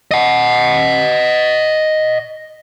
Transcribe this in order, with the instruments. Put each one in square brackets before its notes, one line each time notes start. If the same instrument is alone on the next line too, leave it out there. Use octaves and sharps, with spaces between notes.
[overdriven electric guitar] D#5 F#5